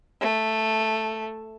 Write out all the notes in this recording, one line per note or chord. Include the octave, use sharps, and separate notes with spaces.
A3